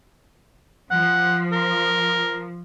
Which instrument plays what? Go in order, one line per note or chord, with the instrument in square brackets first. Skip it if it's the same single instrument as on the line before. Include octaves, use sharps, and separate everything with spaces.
[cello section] F3 [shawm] F#5
[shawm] A#4